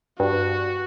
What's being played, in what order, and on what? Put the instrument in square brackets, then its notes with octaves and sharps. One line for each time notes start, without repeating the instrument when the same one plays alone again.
[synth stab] G2 [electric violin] F#4